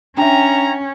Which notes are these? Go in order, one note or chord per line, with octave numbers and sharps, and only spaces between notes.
C#4 D4 E5 G5 A#5